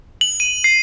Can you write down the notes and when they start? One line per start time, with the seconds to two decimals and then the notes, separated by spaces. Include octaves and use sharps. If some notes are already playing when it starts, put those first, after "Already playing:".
0.21 F#7
0.40 D#7
0.64 C7